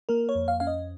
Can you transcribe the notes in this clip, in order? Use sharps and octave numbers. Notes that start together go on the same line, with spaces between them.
A#3 A#4
C#5
F2
F5
C#4 F5
D#5